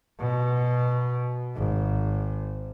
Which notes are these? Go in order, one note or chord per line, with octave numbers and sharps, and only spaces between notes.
B2
G#1